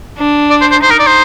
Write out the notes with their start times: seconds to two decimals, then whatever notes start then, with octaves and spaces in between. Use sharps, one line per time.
0.18 D4
0.50 D5
0.61 C5
0.71 C5
0.82 D#4 C5
0.91 A#4
0.99 D5
1.07 C5